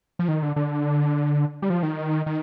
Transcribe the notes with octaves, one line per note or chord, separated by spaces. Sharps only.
F3
D#3
D3
D3
G3
F3
D#3
D#3